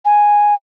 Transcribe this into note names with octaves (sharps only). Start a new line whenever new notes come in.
G#5